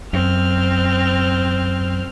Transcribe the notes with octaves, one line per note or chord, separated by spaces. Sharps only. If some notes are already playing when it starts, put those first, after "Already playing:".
F#2 C4 F6